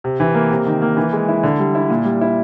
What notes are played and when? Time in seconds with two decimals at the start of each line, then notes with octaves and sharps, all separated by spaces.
0.04 C3
0.20 E3
0.34 A#3
0.51 C3
0.66 D#3
0.82 A#3
0.97 E3
1.13 G#3
1.29 E4
1.43 D3
1.59 G3
1.75 E4
1.90 A#2
2.05 G3
2.21 E4